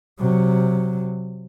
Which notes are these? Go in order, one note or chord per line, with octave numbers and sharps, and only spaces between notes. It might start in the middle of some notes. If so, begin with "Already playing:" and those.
C3 F#3